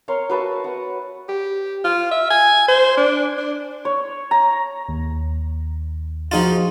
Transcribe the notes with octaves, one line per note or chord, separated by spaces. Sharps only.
A#4 C#5 F5 C6
F#4 B4 E5 A5
F#5
G4
F4
E5
G#5
C5
D4
D4
C#5
A#5
D#2
F3 D#4 F4 F#4 G#4 F5